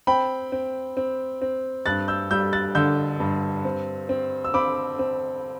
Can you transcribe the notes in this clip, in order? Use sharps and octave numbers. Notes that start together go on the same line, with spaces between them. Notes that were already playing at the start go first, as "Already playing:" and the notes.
C4 G5 B5
C4
C4
C4
G2 F#6 A6
E6 G6
G3 E6 G6
F#6 A6
D3 E6 G6
G2
C4
C4
E6
C4 B5 D6
C4